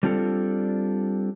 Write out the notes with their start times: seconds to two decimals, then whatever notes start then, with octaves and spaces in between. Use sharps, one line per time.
0.03 G3 C4 D4 F4 G4 A4